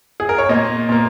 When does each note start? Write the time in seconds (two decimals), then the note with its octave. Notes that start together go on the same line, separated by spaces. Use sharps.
0.20 G#4
0.29 A#4
0.38 C#5
0.49 A#2 A#3 D#5
0.89 A#2 A#3